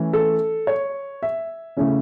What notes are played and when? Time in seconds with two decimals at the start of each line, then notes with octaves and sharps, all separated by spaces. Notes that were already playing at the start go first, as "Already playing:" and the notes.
Already playing: E3 A3 C#4 E4
0.13 A4
0.67 C#5
1.23 E5
1.77 C#3 A3 C#4 E4